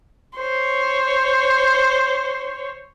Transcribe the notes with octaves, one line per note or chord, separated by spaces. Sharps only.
C5 C#5